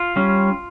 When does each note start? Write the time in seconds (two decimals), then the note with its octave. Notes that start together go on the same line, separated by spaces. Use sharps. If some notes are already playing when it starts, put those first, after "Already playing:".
Already playing: F4
0.16 G3 C#4